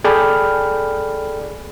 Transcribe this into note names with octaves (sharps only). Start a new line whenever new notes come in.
G#4 A4 D5 G5 B5 F6